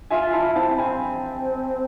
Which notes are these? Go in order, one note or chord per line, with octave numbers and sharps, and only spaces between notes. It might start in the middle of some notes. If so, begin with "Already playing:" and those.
F4 E5 G#5
E4 F5 A5
C4 F5 A5
C4 G#5 B5